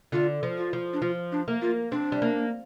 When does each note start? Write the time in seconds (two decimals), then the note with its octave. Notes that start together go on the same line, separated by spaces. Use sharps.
0.12 D3 F4
0.43 F3
0.58 F4
0.73 F3
0.93 D4
1.02 F3 F4
1.32 D4
1.48 A#3
1.62 F4
1.92 C4 D4
2.12 G3
2.22 A#3